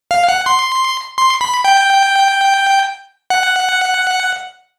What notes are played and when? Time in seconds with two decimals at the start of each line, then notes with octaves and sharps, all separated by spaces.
0.11 F5
0.29 F#5
0.46 C6
1.18 C6
1.41 B5
1.64 G5
3.30 F#5